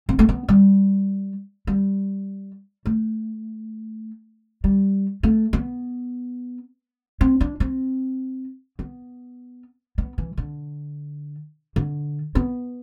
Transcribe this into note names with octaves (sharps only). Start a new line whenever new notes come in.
C4
A3
B3
G3
G3
A3
G3
A3
B3
C4
D4
C4
B3
B3
E3
D3
D3
B3